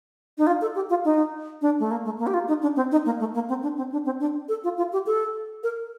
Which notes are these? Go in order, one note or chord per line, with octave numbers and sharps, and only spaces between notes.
D#4
F4
A4
G4
F4
D#4
D4
A3
A#3
A3
A#3
G4
F4
D#4
D4
C4
D#4
A#3
A3
A#3
C4
D4
C4
D4
C4
D4
A4
F4
F4
G4
A4
A#4